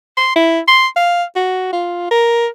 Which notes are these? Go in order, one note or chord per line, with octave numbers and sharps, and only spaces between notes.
C6
E4
C6
F5
F#4
F4
A#4